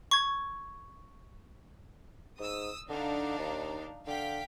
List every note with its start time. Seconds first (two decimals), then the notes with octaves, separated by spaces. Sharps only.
0.11 C#6 G#6
2.40 G#2 D#6 E6
2.89 D3 D4 D#4 F5
3.38 D#2
4.07 D3 F5 G5 B6